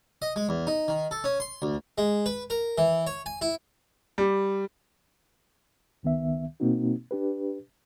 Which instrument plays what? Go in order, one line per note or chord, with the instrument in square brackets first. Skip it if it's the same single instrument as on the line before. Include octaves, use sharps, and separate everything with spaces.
[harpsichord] D#5
G#3
E2
D#4
D#3
A4
C#4
C6
D2
G#3
B4
A#4
E3
C#5
G#5
E4
[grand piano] G3
[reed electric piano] C#2 D#3 B3 E5
B2 A#3 C4 D#4 F#4
D4 G4 B4